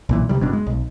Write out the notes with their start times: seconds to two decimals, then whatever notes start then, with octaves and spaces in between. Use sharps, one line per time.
0.09 B1 A#2 E3
0.29 D2 C3 D#3 G3
0.40 F#1 G2 B2 D4
0.53 G#3
0.67 B1